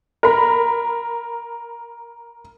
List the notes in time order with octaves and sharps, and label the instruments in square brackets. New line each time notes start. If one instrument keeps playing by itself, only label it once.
[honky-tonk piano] A#4 B5